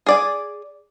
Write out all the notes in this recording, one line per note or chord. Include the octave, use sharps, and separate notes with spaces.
G#4 D5 G#5